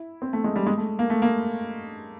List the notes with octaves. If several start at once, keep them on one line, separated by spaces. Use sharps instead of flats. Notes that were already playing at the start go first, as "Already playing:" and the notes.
Already playing: E4
C4
A3
G#3
G3
G#3
A3
A#3
A3
A#3